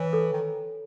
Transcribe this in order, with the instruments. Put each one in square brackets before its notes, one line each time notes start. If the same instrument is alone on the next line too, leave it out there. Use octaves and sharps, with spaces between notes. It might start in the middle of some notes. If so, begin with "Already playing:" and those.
Already playing: [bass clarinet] E3 [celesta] C#5
[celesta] A4
[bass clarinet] D#3